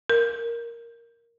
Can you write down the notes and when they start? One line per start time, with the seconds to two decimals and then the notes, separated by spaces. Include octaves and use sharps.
0.10 A#4